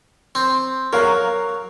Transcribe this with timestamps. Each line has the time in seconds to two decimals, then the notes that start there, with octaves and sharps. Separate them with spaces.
0.35 C4
0.93 F#3 A#4 F5